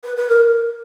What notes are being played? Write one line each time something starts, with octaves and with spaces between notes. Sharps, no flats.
B4
B4
A#4